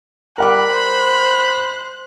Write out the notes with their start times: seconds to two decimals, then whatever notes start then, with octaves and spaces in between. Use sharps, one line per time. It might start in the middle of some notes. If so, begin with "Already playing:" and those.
0.38 G3 A#4 F#5 B5 D6 F#6
0.71 C5